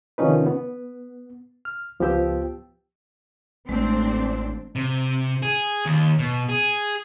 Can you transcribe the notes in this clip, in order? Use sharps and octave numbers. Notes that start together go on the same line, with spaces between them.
C3 D#3 F3 C#4 D#4 B4
B3
F6
C#2 F3 B3 G4 G5 E6
A1 G#3 A3 C4 D4
C3
G#4
D#2
B2
G#4